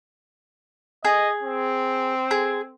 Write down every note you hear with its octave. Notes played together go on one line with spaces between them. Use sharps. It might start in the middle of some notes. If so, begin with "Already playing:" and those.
G#4 D#5
C4
G#4